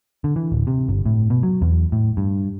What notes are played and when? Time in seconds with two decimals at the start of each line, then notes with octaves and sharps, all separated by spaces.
0.24 D3
0.36 E3
0.52 D1
0.67 C3
0.89 G1
1.06 A2
1.30 B2
1.43 F#3
1.62 E2
1.92 A2
2.17 G2